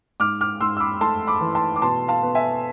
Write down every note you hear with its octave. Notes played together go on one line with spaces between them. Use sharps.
G#2 D6 F6
D6 F6
G#2 C6 E6
E6
B5 D6
A3 A5 C6
B5 D6
E3
A5 C6
D6
B2 A5 C6
F5 A5
B3
E5 G#5